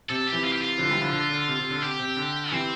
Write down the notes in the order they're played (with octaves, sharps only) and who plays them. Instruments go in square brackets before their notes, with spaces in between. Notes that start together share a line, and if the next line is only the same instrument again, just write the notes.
[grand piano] C3 [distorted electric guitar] A4
[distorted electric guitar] G4
[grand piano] C3 E3
[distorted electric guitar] F4
G4
F4
[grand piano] D3 F3
E3 G3
D3 F3
D3
D3
C3
C3
D3
[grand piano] C3 [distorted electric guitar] G4
[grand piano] C3
D3
[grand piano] C3 E3 [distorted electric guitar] C4